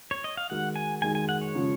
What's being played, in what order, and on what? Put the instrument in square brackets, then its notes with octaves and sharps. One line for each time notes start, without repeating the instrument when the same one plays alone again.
[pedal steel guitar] C#5
D#5
F5
[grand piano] D#3 G#3 D#4 F#4 [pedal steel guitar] F#5
[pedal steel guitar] G#5
[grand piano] D#3 G#3 D#4 F#4 [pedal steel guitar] G#5
[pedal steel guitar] G#5
F#5
C#5
[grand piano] C#3 F3 G#3 C#4 F4